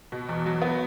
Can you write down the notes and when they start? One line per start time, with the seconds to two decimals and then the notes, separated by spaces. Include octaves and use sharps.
0.12 B2
0.29 E2
0.46 F#3
0.62 B3